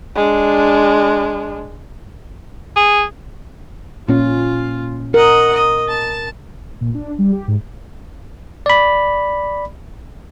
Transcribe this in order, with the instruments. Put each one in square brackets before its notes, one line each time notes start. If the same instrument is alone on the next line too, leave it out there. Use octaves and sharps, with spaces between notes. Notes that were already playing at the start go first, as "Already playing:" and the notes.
[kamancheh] G#3 D4
[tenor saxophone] G#4
[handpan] A#2 C#4 [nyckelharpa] F4
[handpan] A#4 [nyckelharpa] D#5 F#5
[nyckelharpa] D#5
A5
[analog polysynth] A#2
D4
G3
G4
G#2
[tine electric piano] D5 B5